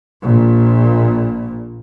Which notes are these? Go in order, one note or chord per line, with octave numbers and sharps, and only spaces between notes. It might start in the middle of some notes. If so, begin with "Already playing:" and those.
A#1 A#2